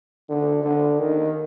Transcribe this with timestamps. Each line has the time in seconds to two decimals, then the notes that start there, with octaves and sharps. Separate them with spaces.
0.29 D3
0.64 D3
0.99 D#3